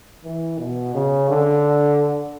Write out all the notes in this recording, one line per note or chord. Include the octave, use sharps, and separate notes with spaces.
E3
B2
C#3
D3